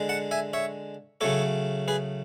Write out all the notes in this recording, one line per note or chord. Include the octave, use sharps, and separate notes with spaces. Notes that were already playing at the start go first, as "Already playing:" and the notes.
Already playing: D3 G#3
F#5 A5
E5 G#5
C#5 E5
C#3 F#3 A3 A4 C#5
G#4 B4